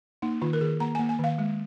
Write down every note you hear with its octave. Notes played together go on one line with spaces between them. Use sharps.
A#3 D#4
D#3 F4
A#4
D#3 G#4
A#3 A#5
G#5
A#3
G#5
D#3 F5
G#3